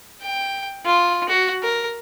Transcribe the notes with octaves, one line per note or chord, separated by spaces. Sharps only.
G5
F4
F#4
A#4